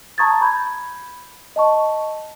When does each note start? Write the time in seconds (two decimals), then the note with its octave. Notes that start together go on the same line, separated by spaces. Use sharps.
0.18 A5 A#5 C#6 D#6 G#6 A6
0.41 B5 G6 G#6
1.56 D#5 A5 C#6